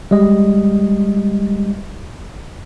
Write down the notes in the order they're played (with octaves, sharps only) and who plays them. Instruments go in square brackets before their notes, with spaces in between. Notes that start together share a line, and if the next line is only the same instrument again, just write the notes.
[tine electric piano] G3 G#3 D#5